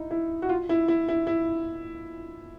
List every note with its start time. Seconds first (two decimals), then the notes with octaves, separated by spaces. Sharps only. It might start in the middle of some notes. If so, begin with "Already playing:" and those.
Already playing: D#4 E4
0.11 E4
0.42 F#4
0.49 F4
0.69 E4
0.88 E4
1.08 E4
1.27 E4